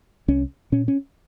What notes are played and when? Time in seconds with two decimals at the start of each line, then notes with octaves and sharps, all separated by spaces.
0.28 C2 C#4
0.72 A#2 C#4
0.88 C#4